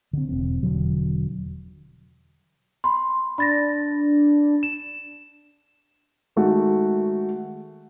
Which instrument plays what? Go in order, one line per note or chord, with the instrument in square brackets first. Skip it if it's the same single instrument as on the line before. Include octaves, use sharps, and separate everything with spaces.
[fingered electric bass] D3 C4
E1 C4
E1 D3 F#3
[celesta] B5 C6
[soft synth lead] D4 [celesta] B5 A6 A#6
[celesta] E7
[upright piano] D#3 G#3 A3 F#4